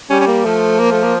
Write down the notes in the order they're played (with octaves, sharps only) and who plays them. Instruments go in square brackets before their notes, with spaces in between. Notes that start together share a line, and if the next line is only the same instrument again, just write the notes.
[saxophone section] G3 [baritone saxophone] C#4
[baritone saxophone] C#4
A#3
[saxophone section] F3 [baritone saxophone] A3
[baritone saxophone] A#3
A3
A#3